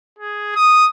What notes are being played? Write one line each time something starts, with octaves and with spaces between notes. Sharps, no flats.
G#4
D#6